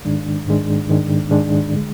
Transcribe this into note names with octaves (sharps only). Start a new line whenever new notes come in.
G#2 D#3 G#3 D4
G#2 D#3 G#3 D4
G#2 D#3 G#3 D4
G#2 D#3 G#3 D4
D3 G#3